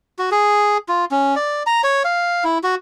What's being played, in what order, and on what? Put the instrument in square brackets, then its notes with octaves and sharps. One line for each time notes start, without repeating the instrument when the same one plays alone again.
[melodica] F#4
G#4
F4
C#4
D5
A#5
C#5
F5
E4
F#4